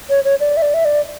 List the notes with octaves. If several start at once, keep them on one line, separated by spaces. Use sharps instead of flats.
C#5
C#5
D5
E5
D5
E5
D5